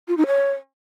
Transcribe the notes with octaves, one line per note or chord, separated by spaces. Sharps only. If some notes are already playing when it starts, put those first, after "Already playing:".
F4
D#4
C#5